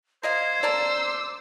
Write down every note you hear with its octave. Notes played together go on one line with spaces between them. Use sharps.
A#4 C5 D#5 F5 G#6
A4 A#4 D5 A#5 E6
D6